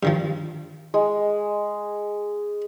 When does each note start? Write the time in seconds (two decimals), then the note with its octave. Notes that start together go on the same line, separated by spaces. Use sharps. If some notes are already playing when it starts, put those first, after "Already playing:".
0.03 G2 D#3 F3
0.94 G#3